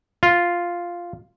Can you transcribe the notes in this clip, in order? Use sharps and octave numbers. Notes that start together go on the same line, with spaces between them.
F4